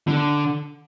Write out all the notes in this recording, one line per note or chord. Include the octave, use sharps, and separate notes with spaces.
D3